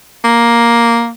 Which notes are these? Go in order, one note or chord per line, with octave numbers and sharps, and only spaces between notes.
A#3